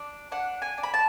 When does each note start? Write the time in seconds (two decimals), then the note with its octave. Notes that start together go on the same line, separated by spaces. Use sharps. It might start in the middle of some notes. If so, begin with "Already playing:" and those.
Already playing: D4
0.31 D4 F#5
0.62 G#5
0.78 D4
0.83 B5
0.94 A5